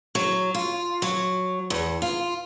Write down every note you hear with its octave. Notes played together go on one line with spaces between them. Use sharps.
F#3
F4
F#3
E2
F4